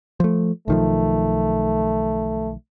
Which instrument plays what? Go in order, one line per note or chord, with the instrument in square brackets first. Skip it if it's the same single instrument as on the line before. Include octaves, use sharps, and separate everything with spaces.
[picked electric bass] F3 A3
[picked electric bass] B1 D#3 F3 [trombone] A3